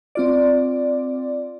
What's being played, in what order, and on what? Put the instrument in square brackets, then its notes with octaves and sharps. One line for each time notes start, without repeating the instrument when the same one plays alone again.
[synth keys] C4 F4 D5